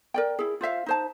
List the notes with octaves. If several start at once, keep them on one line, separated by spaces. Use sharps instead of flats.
A#4 D5 G5
E4 G#4
F4 C5 E5 F5
D#4 C5 A5